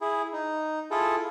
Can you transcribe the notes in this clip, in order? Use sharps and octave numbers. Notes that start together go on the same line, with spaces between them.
E4 G#4
D#4
E4 F4 G#4 A4